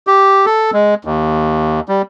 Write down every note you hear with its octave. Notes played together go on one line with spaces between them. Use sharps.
G4
A4
G#3
D#2
G3